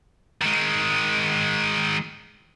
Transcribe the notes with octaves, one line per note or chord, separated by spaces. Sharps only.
D#3 G#3